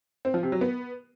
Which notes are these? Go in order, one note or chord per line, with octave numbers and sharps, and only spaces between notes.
C4
F3
C3
F#3
B3